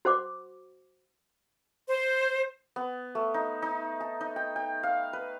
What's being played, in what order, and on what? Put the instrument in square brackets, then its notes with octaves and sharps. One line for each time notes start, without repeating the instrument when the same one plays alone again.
[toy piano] F#4 C5 F#5 D6
[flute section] C5
[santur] B3
A3
D#4
D#4
A5
D#4
G5
G5
F5
B4